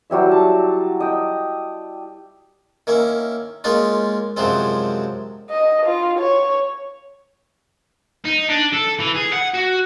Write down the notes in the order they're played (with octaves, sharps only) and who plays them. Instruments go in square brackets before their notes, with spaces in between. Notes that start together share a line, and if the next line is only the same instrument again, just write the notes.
[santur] F#3 G3 E4 E5
A5
D#5 G5
[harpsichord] D#3 A#3 C#4 E4
G#3 A#3 C#4 D#4 F4
F#2 C3 F3 F#3 G#3 C4
[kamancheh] D#5
F4
C#5
[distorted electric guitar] D#4
D4
A4
E3
G#4
F#5
F#4